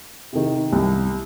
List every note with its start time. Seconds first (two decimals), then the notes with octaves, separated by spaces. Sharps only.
0.33 C3 D#3
0.73 C2